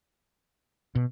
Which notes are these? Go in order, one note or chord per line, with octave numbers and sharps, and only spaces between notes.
B2